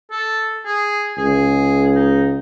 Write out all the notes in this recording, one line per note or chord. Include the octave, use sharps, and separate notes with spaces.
A4
G#4
C#2 G#4
D#4